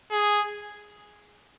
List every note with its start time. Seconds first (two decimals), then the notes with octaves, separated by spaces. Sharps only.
0.11 G#4